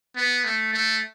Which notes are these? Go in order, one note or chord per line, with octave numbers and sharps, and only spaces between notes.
B3
A3
A3